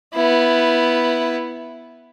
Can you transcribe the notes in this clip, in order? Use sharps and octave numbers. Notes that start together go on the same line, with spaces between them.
B3 E4